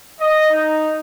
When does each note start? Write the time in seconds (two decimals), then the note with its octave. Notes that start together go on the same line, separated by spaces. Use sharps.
0.20 D#5
0.51 D#4